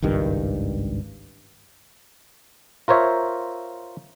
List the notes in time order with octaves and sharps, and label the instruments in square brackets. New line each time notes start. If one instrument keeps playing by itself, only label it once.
[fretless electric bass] G#1 C#2 G2 D#3
[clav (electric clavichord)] F4 A#4 C5 C#5 E5